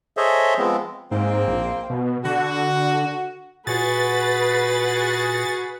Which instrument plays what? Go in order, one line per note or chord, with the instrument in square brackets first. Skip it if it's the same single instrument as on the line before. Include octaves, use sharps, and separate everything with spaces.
[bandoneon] G#4 A4 C5 C#5 D#5 E5
F3 G#3 B3 C4
[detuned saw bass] G#2 [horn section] A#3 C4
[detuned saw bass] A#1
B2
[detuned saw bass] D3 [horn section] F#4
[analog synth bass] A#2 [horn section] F#4 G#4 [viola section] B4 [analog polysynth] A6